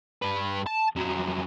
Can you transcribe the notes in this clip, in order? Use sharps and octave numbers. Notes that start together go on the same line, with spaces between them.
G2 B4
A5
F2 F#3